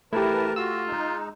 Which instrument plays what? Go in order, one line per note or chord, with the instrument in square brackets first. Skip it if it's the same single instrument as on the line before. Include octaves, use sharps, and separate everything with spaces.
[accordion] E3 B4 A5 [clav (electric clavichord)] A3 G4 [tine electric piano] E4 [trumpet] A#4
[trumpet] F4 [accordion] F#4 [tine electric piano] E6
[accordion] G#3 D#4